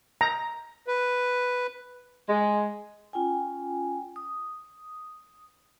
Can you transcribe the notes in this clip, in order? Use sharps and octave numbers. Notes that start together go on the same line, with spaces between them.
A#5
B4
G#3
C#4 F4 G5 G#5
D#6